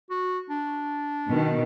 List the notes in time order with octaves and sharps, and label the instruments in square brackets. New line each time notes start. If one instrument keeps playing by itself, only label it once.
[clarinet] F#4
D4
[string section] B2 D#3